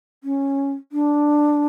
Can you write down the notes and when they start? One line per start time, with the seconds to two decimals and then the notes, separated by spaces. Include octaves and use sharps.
0.24 C#4
0.92 D4